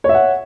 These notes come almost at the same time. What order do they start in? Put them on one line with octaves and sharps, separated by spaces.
C#5 E5 F#5